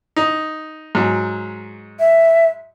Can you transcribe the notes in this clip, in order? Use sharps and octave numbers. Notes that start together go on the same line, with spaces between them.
D#4
G#2 F#3
E5